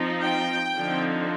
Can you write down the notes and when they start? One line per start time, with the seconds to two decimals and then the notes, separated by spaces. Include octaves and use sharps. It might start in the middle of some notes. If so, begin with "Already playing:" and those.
Already playing: F3 C4 D#4
0.21 G5
0.76 D3 F3 C4 D#4